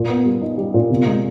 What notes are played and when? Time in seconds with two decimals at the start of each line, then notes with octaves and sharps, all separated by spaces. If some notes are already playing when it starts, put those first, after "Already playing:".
Already playing: A#2
0.09 B3
0.25 G3
0.41 D#4
0.57 G3
0.74 A#2
0.90 C3
1.06 G#3